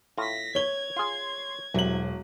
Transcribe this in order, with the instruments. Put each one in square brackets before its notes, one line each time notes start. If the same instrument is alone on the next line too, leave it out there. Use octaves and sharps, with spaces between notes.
[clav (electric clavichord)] A2 F4 [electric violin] A#6 B6
[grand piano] C#5 G7 [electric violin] G#6
[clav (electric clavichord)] F4 G#4 [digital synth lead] C6
[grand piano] E1 F#7 [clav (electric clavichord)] C2 [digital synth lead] F#3